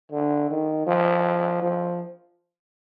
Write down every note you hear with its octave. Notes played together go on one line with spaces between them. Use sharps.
D3
D#3
F3
F3